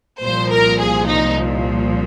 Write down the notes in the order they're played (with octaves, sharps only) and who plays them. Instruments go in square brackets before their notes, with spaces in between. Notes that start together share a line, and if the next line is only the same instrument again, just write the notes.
[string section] C2 A#2 F3 C5
A#4
G#4
D#4